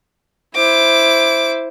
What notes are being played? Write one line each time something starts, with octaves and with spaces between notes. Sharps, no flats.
E4 C5 D6